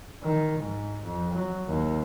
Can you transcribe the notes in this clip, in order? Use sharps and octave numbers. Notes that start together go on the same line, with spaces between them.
D#3
G#2
F2
F#3
D#2